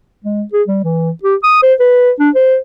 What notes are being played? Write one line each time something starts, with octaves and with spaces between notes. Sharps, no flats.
G#3
G#4
G3
E3
G4
D#6
C5
B4
D4
C5